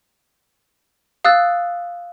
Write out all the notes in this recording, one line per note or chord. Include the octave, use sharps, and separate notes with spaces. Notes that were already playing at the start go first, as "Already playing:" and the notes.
F5 D#6 E6 F#6 A6